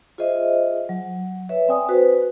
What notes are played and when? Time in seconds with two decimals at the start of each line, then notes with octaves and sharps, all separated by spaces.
0.18 F4 G#4 C5 D#5 E5
0.89 F#3
1.49 B4 C#5 E5
1.68 C4 D5 G5 G#5 D#6
1.89 F#4 B4 C5